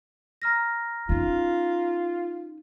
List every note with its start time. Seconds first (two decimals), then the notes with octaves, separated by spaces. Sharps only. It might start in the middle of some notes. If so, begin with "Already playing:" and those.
0.42 A#5 F6 A#6
1.09 C#4 D#4 F4